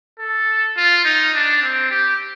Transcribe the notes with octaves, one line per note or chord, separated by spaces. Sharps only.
A4
F4
D#4
D4
C4
G4